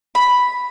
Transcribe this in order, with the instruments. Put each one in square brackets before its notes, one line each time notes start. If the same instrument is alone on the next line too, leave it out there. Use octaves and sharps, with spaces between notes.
[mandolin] B5